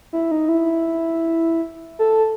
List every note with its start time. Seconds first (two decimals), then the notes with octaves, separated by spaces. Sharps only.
0.13 E4
0.31 D#4
0.49 E4
1.99 A4